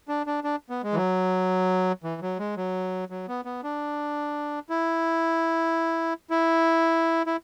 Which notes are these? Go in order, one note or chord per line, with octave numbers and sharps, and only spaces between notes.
D4
D4
D4
B3
G#3
E3
F#3
E3
F#3
G#3
F#3
F#3
B3
B3
D4
E4
E4
E4